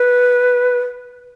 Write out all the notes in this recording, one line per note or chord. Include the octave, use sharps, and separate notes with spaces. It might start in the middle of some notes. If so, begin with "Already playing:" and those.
Already playing: B4